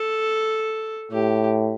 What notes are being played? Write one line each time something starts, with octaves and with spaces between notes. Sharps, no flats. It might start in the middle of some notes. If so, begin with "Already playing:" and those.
Already playing: A4
A2 G4